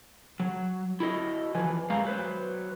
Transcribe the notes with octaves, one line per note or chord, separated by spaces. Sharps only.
F#3
E4 F#4 A4 D#5
E2 E3 F3 B4 G#5
F#2 G#3 A3 F5 A#5
F#3 B4 C5